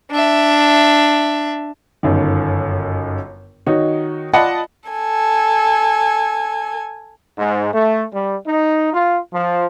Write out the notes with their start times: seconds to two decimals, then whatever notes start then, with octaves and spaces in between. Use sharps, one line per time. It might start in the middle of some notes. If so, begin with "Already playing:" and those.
0.11 D4 E5
2.03 G1 F#2 D#3
3.66 D#3 D#4 F#4 C#5
4.33 F4 D5 D#5 F#5 A5 B5
4.91 A4 G#5
7.39 G#2
7.74 A3
8.13 G3
8.47 D#4
8.93 F4
9.33 F3